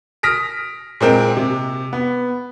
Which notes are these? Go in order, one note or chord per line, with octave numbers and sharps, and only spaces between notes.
D#6 F6 A#6 B6 D7
A#2 G#3 C4 A#4
C3
B3